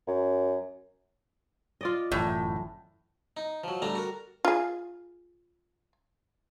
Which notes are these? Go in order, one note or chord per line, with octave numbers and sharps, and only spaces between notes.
F#2
F4 D5 D#5
G1 F#2 A2 E3
D#4
F3 F#3
G3 A3 D4 A5 A#5
F#4 A#4
F4 G#4